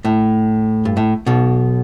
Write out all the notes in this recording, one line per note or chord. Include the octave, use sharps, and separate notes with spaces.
A2
G2
A2
B1 B2